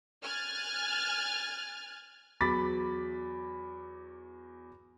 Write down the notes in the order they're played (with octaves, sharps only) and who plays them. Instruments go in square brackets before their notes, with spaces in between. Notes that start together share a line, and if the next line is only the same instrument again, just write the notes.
[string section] G#5 F6 F#6 G#6 A6
[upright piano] E2 F#3 B5 D6 A6 B6